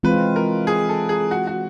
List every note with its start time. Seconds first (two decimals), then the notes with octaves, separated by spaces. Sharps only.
0.03 E3 G#3 C4 F4 B4
0.36 A#4
0.67 G#4
0.89 A4
1.09 G#4
1.31 F#4
1.47 F#4